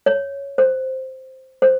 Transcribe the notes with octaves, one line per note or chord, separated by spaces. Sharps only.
C#5
C5
C5